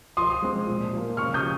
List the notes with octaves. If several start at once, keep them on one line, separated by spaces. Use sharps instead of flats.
F3 C6 D#6
G#3 C4
A#2
F3 A#3
C#3 C#6 F6
D#6 G6
F3